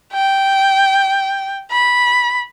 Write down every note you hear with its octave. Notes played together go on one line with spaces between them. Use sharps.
G5
B5